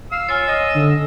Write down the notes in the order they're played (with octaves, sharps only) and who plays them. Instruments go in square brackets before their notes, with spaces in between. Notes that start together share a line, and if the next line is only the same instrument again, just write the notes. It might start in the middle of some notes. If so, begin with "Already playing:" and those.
[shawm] F5 [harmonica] E6
[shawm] F4 [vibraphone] C#5 G#5
[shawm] D#5
[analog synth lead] D3